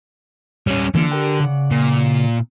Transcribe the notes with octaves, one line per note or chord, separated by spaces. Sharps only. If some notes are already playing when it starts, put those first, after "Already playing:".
G3 C#4 C#5
D3 E3 A#3 F4
G4 A#4 G5
C#3 D5 F#5
A#2